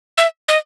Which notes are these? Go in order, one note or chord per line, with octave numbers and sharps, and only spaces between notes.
E5
D#5